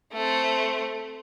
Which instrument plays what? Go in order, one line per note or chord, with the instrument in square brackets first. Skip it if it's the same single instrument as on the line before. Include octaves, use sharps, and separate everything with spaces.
[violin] A3 C4